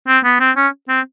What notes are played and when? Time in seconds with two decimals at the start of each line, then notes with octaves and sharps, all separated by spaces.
0.07 C4
0.24 B3
0.40 C4
0.56 C#4
0.89 C4